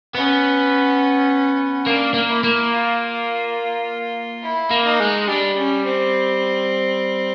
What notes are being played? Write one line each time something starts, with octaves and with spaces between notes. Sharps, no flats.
B3 C#4
A#3 D4
A#3
E4
A#3
F4
E4
A#3
D#4
G#3
G3 D4
C#4
C4